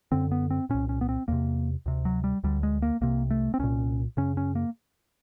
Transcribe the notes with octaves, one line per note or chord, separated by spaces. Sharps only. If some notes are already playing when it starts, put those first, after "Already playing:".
F#2 D3 C4
B3
C4
C2 A#2 C#4
C#4
B3
C4
E2 C3 A#3
D2 C3
F#3
G3
D2 D3 G3
G#3
A#3
C2 C3 A#3
A3
C4
C2 A#2 C#4
F#2 C#3 C#4
C#4
A#3